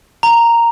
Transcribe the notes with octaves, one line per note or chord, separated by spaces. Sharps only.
A#5